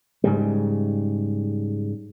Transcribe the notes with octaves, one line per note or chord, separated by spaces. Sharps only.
G#2 C#3 G3